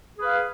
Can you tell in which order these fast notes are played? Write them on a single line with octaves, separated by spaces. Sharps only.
G#4 B4 F5